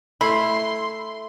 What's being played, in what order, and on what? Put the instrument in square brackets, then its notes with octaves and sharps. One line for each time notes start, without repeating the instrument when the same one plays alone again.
[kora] A3 E4 [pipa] B5 [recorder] C6